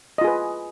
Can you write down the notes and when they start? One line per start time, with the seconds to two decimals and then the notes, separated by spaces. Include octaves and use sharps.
0.18 D#5
0.21 F4
0.24 G#4
0.27 B4